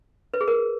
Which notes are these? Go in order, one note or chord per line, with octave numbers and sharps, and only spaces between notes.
B4
G#4
A#4